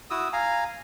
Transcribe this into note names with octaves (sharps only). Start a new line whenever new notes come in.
E4 F#4 D#6 E6
F5 G#5 A#5